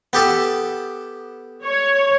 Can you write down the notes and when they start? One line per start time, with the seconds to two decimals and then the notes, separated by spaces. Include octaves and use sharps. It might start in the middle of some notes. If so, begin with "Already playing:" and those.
0.13 B3 G4 A4
1.64 C#5